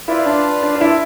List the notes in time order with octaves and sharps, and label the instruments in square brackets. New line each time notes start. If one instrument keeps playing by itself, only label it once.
[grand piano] E4 [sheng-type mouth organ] F4 B4 D5 F5
[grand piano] D4
D4
D4
E4